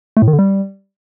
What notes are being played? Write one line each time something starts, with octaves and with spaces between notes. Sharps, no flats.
A3
A2
D#3
D3
G3